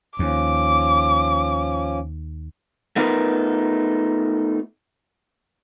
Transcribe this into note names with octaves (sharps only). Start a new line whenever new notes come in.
D#2 F3 C#4 D6
A3 B3 D#4 F4 A#4 B4